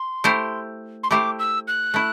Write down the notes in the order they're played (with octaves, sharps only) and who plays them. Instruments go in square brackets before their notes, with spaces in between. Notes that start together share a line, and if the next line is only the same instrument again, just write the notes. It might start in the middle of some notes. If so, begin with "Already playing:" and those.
Already playing: [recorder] C6
[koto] A3 E4 G4 C5
[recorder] C6
[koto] A3 E4 G4 C5 [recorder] D6
[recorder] E6
F#6
[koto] A3 E4